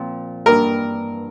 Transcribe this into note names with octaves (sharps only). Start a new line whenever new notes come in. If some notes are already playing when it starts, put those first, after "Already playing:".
Already playing: A#2 F3 C4 F4
G2 E3 A#3 D4 A#4